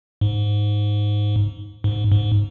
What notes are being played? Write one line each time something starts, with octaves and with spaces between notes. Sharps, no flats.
G#2
G#2
G#2